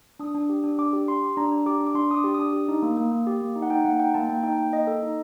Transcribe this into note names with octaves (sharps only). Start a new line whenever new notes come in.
D4 D#6
D4
G4
D4
D4 D6
G4
G4 C6
G4
D4 A#5
D4
G4 D6
D4
D6
D4 C6
D4 D6 D#6
G4
D4 D#6
G4
D#4
A#3
A#3
A#3
G4
A#3
D#4
F#5
D#4 G5
A#3 F#5
D#4 G5
A#3 A5
A#3 G5
D#4 G5
A#3 G5
A#3 D#5
A4
D#4